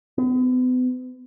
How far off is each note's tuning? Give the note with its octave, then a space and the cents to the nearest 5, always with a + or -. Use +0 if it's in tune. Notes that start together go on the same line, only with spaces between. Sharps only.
B3 +40